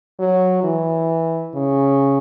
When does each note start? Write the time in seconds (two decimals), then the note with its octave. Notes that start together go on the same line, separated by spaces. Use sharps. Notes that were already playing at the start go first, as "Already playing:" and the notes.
0.19 F#3
0.64 E3
1.55 C#3